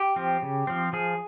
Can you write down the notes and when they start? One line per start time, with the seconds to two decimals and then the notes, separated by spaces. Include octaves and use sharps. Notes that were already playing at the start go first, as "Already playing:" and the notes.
Already playing: G4
0.16 F3 C4
0.42 C#3
0.67 F3 C4
0.93 F3 G#4